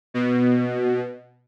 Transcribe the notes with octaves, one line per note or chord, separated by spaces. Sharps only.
B2